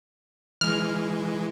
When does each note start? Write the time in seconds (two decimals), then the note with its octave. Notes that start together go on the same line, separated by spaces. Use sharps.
0.61 E3 G#3 F6